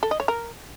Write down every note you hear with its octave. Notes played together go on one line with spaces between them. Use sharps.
A4
D#5
C#5
A#4